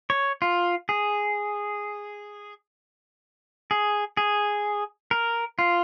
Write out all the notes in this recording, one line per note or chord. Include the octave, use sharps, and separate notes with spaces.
C#5
F4
G#4
G#4
G#4
A#4
F4